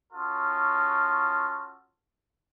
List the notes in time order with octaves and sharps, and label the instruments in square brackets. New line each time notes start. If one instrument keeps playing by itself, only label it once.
[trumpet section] C#4 F4 F#4 A4 D#6